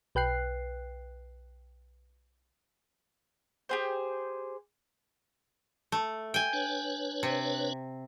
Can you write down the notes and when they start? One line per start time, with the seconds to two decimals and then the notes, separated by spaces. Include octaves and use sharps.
0.15 B1 B4 G5 F#6 C7
3.69 G4 G#4 C5
5.92 A3
6.34 G5 G#5
6.53 D4 B4 C#5
7.23 C3